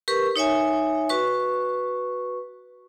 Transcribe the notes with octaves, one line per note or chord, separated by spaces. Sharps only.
G4 A#4 B4 C#6
D#4 C#5 E5 G#5
F#4 B4 C#6